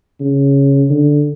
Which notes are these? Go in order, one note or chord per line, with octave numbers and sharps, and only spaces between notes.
C#3
D3